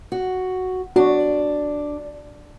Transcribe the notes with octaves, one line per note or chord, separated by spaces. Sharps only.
F#4
D4 F#4